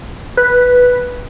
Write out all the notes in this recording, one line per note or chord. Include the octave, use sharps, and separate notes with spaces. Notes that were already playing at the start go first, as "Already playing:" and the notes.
B4